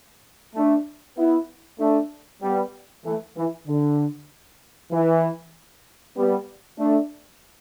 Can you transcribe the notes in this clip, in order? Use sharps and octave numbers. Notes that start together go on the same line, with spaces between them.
A3 D4
B3 E4
A3 D4
G3 B3
E3 A3
E3
D3
E3
G3 B3
A3 D4